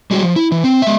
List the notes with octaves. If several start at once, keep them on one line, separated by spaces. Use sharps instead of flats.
G3 G#3 F#4
F3
E4
E3
C4
G#3 E5